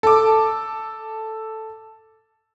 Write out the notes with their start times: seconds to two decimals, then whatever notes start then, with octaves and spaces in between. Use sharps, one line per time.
0.03 A4 D6